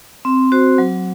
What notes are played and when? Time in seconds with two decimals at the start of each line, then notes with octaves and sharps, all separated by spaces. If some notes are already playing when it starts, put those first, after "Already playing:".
0.25 C4
0.52 F#4 C5
0.78 F#3